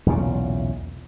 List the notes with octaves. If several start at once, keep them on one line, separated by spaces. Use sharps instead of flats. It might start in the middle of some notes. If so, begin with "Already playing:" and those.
B1 E2 A#2 C#3